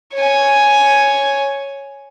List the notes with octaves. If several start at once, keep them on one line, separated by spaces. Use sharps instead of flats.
C#5 G#5